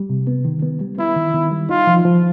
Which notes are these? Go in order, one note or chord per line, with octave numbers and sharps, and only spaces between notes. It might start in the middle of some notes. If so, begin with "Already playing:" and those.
Already playing: G3
C3
B3
D#3
B3
G3
B3 E4
D#3
D#3
G3
D#4 F4
F3
F3